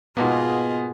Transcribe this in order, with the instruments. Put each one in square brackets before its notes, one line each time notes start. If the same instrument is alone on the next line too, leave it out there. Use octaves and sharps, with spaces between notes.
[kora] G#2 B2 A#3 [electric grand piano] B3 [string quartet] F4 G#4 D#5